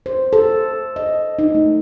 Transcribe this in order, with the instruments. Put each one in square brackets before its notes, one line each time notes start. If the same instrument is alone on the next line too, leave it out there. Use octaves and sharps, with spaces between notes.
[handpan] C5
A4
D#5
D#4
A3